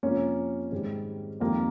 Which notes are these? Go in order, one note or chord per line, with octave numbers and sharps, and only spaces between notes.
F2 C3 F3 A#3 C#4
G#2 D#3 G3
F2 D#3 G3 A#3